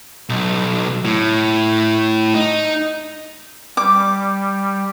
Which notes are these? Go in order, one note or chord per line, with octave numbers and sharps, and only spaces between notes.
B1
A2
D#4
G3 D6